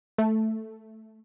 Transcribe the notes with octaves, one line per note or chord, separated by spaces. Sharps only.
A3